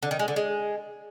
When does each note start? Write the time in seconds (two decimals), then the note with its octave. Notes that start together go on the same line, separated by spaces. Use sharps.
0.03 D3
0.11 D#3
0.19 G#3
0.28 D3
0.36 G#3